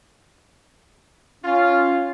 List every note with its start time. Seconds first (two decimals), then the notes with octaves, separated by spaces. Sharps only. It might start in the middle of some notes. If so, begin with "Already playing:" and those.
1.44 C#4 F4